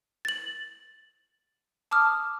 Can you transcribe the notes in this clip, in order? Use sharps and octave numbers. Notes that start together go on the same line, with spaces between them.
A6 F#7
A5 D6 D#6 F6